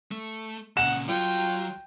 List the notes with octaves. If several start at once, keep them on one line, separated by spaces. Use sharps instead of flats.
A3
A#2 C#3 F#5 E7
F#3 F4 G5